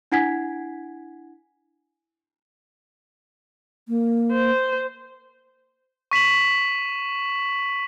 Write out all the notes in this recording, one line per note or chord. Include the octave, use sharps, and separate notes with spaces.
D4 E4 F#5 G#5 G#6 B6
A#3
C5
C#6 B6 E7 F#7